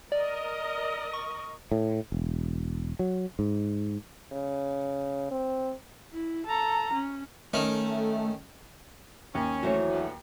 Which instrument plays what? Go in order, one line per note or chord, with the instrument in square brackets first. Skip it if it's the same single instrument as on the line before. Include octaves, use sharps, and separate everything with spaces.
[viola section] A#4 D#5 [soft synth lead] D5
[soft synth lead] C#6
[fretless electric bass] A2
E1
F#3
G#2
[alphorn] C#3
C4
[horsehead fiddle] E4
A4 A#5
C#4
[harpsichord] D#3 C#4 [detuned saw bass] A3
[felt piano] D#2 [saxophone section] C#4
[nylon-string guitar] E3 F#3 A3 [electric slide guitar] F#4 C5 C#5
[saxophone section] D2 B3